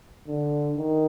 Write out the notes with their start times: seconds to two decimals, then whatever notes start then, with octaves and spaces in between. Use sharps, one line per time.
0.27 D3
0.78 D#3